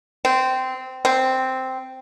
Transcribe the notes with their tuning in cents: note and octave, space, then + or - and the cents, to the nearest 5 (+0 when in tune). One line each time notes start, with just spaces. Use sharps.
C4 -15
C4 -5